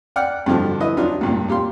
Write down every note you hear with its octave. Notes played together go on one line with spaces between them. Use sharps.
D5 F#5 G5 F6
G2 B2 D3 F3
E4 B4 D#5
F#3 D4 D#4 F4
C#2 G2 A#2
A#2 G4 F5 C6